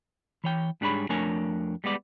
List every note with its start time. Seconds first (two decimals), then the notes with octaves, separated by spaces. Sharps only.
0.44 E3 C#5 G5
0.81 G#2 G3 D4 G#4 C#5 B5
1.09 F2 A3 D4 A#4 C#5 G#5
1.84 G3 G#3 B3 D5